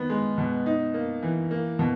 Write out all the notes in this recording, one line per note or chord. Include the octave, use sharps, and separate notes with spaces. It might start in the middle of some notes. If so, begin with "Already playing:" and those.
Already playing: D#3 B3
G#3
B2
D#4
A#3
E3
A#3
B2